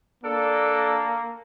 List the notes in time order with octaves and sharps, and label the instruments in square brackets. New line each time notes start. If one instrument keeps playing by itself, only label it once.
[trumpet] A#3 [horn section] D4 A4